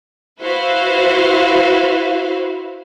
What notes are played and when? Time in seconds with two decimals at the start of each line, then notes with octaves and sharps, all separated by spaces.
0.40 E4 F#4 B4 C5 E5 F5